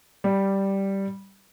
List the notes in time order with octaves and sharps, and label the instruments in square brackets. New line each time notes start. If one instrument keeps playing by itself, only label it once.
[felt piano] G3